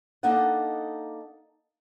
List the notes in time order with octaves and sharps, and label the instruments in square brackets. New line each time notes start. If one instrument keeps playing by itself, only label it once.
[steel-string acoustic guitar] A#3 D4 D#4 A4 D#5 F#5